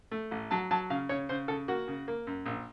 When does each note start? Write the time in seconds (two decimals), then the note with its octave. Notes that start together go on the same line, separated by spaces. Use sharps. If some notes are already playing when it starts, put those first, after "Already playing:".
0.11 A3
0.31 A1
0.51 F#3 A5
0.71 F#3 A5
0.90 C#3 F5
1.09 C#3 C#5
1.29 C#3 C5
1.48 C#3 A4
1.68 A#3 F#4
1.88 C#3
2.08 A#3
2.27 F#2
2.46 A#1